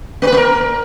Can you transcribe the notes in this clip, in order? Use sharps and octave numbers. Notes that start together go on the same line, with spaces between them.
A#3
B4
A#3
A#4